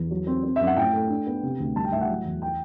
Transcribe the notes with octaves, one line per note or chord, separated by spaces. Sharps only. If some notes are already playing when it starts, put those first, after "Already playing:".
Already playing: E2
F#3
C4
C4
F#2 E5
F#5
A2 G5
A3
D4
B3
C3
D2
G3 A5
G5
A2 E5
F#5
F#3
E2
G5